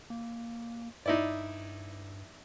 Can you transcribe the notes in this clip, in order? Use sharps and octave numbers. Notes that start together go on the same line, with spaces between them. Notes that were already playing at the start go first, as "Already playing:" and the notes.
A#3
G2 D#4 E4 D5